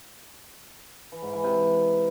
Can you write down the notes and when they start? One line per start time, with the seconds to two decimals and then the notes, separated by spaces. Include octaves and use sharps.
1.12 E3
1.23 G#2
1.33 E3
1.44 C3